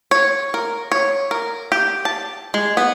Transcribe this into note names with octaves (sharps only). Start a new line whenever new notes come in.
C#5
A#4
C#5
A#4
G4
A5
G#3
B3